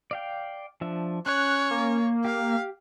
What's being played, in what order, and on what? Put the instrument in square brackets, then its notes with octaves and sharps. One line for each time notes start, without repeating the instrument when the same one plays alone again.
[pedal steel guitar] D5 F5 G5
F3 D4 E5
[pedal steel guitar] C#4 [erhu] C#5 [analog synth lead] F#6
[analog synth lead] A#3
[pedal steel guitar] G4 [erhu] F5